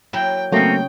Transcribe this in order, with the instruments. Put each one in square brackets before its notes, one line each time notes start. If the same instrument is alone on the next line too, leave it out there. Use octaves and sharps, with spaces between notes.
[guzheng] F#3 A#3 E4 [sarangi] G5
[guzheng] C#3 D#4 [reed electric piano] F#3 A3 A#3 [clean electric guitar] C4 C#4 [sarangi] G5